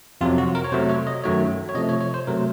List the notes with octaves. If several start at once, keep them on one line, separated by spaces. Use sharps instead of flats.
F2 C3 F#3 F4
F#4
A#4
C#5
C3 F#3 A3 C5
C#5
D#5
F#2 D#3 F#3 A3 C#5
C#5
C3 F3 A3 D#5
C#5
C#5
C5
C3 F#3 A3 A#4